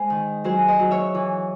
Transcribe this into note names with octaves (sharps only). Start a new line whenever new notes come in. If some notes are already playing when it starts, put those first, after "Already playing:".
Already playing: G#3 G#4 C5 D#5
D#3
F#3 G#4 C5
C5 D#5
F#3
C#5 E5
E3